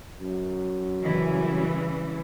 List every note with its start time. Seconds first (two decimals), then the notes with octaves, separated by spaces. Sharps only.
0.21 F#2
1.02 C#3 E3 G3